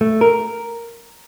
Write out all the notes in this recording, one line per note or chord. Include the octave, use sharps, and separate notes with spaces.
A3
A#4